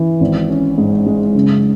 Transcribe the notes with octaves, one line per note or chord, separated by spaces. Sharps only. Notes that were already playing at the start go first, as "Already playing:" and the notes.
Already playing: E3
G#1
C#4
G#2
G#3
F#1